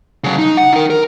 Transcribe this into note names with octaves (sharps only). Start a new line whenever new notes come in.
C#3 F#3
D#4
F#5
D#4 A#4
A#4